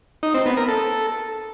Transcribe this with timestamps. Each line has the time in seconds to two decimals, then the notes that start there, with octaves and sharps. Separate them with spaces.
0.23 D#4
0.34 C4
0.46 B3
0.57 A#4
0.68 A4